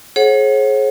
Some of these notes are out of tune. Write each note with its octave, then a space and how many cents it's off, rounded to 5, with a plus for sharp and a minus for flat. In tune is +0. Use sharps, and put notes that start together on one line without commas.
G#4 +30 C#5 -45 F#5 +0